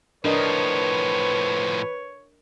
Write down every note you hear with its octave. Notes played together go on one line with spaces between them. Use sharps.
A2 F3 D4 A#4 B4 C#5 D#5